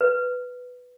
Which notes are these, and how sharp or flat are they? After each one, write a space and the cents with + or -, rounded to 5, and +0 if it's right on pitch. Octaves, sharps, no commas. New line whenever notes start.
B4 +5